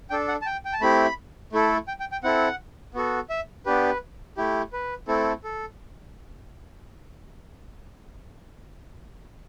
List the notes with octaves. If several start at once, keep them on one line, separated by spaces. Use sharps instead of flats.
D4 A4 G5
F#5
A5
G5
G5
A5
A3 C4 E4 G4 B5
A3 E4 A4
G5
G5
G5
C4 E4 A4 F#5
B3 F#4 A4
E5
B3 D4 G4 B4
A3 E4 G4
B4
A3 C4 E4 A4
A4